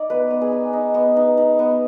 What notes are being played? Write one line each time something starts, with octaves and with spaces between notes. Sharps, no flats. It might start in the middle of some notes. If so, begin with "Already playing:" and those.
Already playing: D#4 D5
B3 B4
B3
G#4
D#4
D#4
B3
D#4
D#4
B3